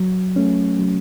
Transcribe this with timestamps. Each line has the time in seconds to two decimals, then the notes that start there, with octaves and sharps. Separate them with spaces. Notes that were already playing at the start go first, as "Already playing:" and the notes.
Already playing: F#3
0.36 A3 C#4
0.79 F#3